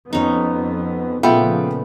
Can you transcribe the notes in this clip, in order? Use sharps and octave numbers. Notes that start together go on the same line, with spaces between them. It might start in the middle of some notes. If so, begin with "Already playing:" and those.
F2 B3 C#4 D#4
A#2 C#3 F3 A3 B3 F4 E5 G5